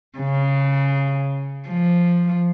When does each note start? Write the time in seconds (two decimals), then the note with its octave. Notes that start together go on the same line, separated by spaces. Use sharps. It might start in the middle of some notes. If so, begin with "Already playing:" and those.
0.18 C#3
1.69 F3